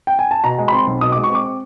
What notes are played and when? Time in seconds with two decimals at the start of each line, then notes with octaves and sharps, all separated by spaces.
0.07 G5
0.19 G#5
0.31 A5
0.44 B2 A#5
0.58 G#3
0.68 B5
0.72 C4 C6
0.87 B1
1.01 B2 D#6
1.12 G#3 D6
1.24 C#6
1.30 C4 D6